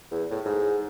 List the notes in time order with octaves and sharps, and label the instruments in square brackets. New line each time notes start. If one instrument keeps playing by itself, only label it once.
[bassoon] E2
A2
G#2